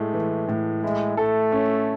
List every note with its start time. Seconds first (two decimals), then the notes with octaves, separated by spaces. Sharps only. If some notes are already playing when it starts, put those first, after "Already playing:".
Already playing: A2 G#3 A3
0.13 E3
0.48 A2
0.83 G#3 E4
1.17 A3 A4
1.52 C#4